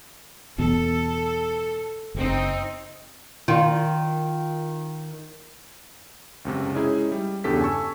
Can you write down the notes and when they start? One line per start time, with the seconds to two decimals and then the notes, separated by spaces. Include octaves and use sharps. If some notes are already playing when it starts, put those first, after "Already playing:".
0.58 E1 E2 B2 A4
2.15 F#1 C4 D#4
3.48 D#3 F4
6.45 C#2 F#2 C3
6.73 G#3 C#4 D#4 E4 G#4
7.12 G3
7.44 E2 G2 C#3 G4 A4 B6
7.61 G#5 A5 C#6 E6